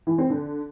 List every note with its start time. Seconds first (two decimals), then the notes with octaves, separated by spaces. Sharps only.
0.07 E3
0.18 C4
0.30 D3